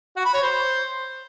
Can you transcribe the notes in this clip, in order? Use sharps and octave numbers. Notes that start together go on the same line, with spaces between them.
F#4
B5
C#5
C5